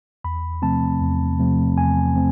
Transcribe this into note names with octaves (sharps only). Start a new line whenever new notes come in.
E2 B5
C3 F3 A3 C4 A5
E2
C3 F3 A3 C4
E2 G#5
A3 C4